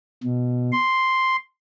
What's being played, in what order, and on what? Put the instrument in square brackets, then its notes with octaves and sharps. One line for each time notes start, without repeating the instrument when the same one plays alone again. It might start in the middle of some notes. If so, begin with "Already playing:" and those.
[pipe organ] B2
C6